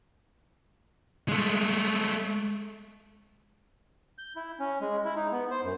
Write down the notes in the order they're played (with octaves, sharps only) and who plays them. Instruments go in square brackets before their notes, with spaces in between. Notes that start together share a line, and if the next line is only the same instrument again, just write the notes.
[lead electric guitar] G#3 A3
[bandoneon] G6
E4
C#4
G#3
E4
D#4
B3
C5
F#2